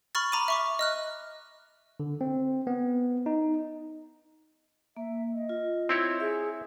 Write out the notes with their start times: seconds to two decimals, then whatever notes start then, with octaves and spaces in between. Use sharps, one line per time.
0.15 B5 C#6 F6 A6
0.32 A#5 B5 D6 D#7
0.48 E5 C#6 D6
0.79 D#5 F6 F#6
2.00 D3
2.21 C4
2.67 B3
3.26 D#4
4.97 A#3 E5
5.34 D#5
5.49 F4
5.89 C4 E4 C#5
6.20 G#4 E5